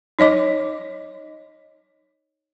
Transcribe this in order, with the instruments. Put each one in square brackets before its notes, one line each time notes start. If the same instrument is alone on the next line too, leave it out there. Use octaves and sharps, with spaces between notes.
[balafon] D#4 C#5 D#5 D6